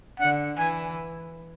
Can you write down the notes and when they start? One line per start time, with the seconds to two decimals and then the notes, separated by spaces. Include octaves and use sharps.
0.19 D3 F#5
0.58 E3 G#5